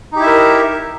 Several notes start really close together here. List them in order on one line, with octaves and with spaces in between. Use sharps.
D#4 G4 E4 E5 A#4